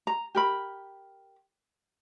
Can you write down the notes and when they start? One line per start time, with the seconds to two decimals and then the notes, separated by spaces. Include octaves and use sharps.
0.07 A#5
0.35 G4 A#4 B5